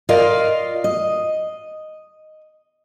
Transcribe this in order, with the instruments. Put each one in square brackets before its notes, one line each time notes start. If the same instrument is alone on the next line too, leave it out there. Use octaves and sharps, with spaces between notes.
[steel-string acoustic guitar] F4 A#4 D5 D#5 F5
D#5